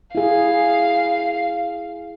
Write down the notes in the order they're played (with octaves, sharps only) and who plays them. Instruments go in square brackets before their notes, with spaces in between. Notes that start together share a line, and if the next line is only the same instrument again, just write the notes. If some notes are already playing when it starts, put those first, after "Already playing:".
[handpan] E4 G#4 [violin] F5